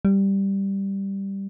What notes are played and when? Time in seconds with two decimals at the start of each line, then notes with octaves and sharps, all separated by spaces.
0.05 G3